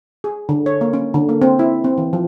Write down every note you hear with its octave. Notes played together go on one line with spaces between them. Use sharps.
G#4
D3
C#5
A#3
C#4
D3
A#3
C4
E4
C4
E3
F3